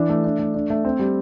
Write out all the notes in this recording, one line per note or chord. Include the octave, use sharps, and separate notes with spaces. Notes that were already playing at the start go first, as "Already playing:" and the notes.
Already playing: E3 D4
A3
D4
A3
D4
A3
C4
G3